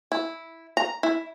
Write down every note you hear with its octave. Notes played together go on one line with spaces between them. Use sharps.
E4
A#5
E4